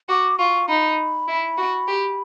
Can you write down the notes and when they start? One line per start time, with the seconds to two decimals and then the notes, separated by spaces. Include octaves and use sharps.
0.08 F#4 D6
0.39 F4 C#6
0.68 D#4 B5
1.28 E4
1.58 F#4
1.87 G4